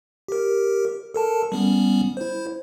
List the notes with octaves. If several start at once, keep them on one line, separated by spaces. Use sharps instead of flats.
G4 A#4
A4 A#4 A5
G3 B3 C#4
E4 C5